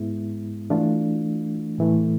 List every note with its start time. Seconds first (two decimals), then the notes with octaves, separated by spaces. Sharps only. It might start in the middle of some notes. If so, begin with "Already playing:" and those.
Already playing: G#2 G#3 B3 E4
0.70 E3 A3 D4 F4
1.78 A2 E3 A3